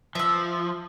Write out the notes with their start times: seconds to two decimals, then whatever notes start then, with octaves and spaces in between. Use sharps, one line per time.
0.15 F3 E5 E6